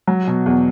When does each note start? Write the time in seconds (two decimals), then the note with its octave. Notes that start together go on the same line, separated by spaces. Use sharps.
0.08 F#3
0.27 B2
0.46 E2